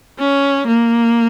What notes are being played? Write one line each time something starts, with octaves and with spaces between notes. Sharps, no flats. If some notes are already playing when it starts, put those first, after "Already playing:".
C#4
A#3